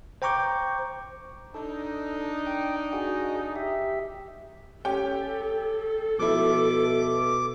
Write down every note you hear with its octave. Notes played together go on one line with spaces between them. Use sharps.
C5 G5 A#5 C#6 D6 G6
D4 D#4 A4
G5
F#4 G#4 D#5
G4 E5
C#4 G4 A4 G5
B2 F3 E4 D6